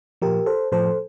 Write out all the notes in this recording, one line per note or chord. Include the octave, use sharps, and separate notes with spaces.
A#2 F3 G4 A#4
A4 C5
A2 F3 A4 C5